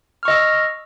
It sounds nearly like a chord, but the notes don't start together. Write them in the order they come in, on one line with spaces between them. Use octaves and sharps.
F6 C#6 D#5 E6